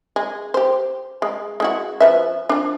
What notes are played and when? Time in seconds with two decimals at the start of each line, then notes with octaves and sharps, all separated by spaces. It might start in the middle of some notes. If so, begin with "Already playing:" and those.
0.16 G#3
0.54 G4 C5
1.22 G#3
1.60 G#3 E4 F#4
2.00 F3 B4 E5
2.49 F3 D4